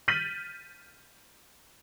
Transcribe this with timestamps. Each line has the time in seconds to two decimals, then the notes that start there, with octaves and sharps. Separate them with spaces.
0.08 F6 G6 A6 B6 D#7 F#7